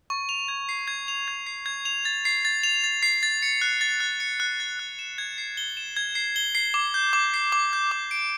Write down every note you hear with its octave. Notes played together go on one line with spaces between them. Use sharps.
C#6
F7
G#6
C7
G#6
F7
G#6
C7
G#6
F7
A6
C7
A6
F7
A6
C7
A6
C#7
F#6
A6
F#6
C#7
F#6
A6
F#6
E7
G#6
C7
G7
E7
G#6
C7
G7
C7
D6
G6
D6
C7
D6
G6
D6
D7